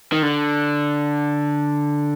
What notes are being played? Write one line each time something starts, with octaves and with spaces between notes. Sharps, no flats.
D#3
D3